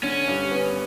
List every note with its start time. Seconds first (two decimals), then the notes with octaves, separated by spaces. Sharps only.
0.02 D3 C#4
0.28 G2
0.51 B3